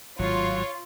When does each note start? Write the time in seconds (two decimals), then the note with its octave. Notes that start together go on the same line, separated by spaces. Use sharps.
0.19 G#1 A2 F#3 F4 C#5